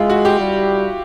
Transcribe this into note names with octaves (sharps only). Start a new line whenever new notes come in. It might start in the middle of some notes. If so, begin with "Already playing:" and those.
Already playing: G#3 E4 F4
F#4
G4
G3